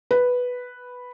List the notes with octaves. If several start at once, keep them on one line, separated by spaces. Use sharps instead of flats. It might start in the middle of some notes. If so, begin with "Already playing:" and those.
B4